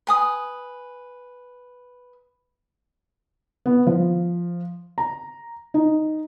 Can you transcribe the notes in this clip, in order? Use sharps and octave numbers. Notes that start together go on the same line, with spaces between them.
B4 G#5 D#6
B3
F3
A#5
D#4